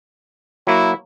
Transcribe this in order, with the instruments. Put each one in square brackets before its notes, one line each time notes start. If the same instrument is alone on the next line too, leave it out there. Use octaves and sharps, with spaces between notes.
[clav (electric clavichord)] F#3 A#3 F#4 [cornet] E4